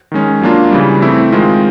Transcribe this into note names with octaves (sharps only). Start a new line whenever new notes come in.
D#3 G#3 C#4
F#3 A#3 D4 F4
C#3 E3 G3
E3 A3 C4 E4
D#3 G#3 C4 F4